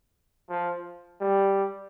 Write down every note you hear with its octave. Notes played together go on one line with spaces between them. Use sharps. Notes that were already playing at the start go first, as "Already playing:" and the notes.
F3
G3